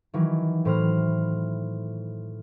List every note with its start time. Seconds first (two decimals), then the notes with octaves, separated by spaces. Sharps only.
0.14 D#3 E3 F#3
0.65 A2 C5 F6